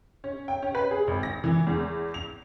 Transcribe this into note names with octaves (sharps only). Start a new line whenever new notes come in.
C#4
G5
C#4
B4
G#4
G#1
A#6
E3
E2
F7